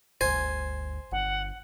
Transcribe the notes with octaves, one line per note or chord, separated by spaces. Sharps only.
G1 D2 C5 G#5
G1 F#5